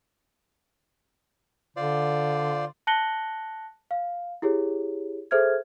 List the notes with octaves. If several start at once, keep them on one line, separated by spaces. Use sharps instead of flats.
D3 F4 C5 D5
A5 F#6 A#6 C#7 F#7 G7
F5
E4 G4 G#4 C#5
G#4 A4 C5 E5 F6 G#6